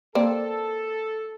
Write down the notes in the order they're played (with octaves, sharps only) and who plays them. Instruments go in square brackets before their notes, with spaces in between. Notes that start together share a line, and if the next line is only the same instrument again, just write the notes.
[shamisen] A#3 C4 D5 [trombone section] A4